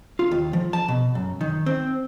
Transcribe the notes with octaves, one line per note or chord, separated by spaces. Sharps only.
F4
D#2
F3
A5
B2
F#2
D#3
C4